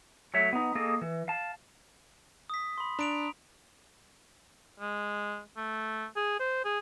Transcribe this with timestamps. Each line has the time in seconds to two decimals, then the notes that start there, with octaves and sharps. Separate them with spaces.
0.34 F#3 A3 C#5 E5
0.53 B3 D#4
0.75 A#3 G#4 A4 D#5
1.01 E3
1.28 F5 A5
2.50 D#6 B6
2.78 B5 C6
2.99 D4 A#5 D7 F7
4.80 G#3
5.57 A3
6.16 G#4
6.40 C5
6.65 G#4